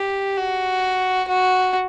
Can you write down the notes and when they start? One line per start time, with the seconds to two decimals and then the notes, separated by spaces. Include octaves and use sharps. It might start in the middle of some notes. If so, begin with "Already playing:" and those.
Already playing: G4
0.38 F#4
1.28 F#4